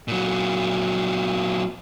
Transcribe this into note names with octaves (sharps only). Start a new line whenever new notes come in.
A#2 F#3